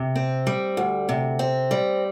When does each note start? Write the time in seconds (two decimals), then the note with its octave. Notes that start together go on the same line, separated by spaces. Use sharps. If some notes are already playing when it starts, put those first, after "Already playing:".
Already playing: C3
0.16 C4
0.47 G3
0.77 D2
1.09 C3
1.39 C4
1.71 G3